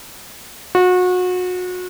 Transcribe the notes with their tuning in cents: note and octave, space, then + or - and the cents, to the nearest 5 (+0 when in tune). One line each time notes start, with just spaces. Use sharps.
F#4 -30